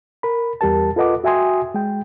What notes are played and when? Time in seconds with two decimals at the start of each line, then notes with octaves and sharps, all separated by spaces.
0.23 A#4 B5
0.61 E2 G3 G4 A#4 A5
0.96 F4 A4 B4 D#5 F#5 D6
1.24 F#4 E5 G5 G#5 C6 D#6
1.74 G#3 G5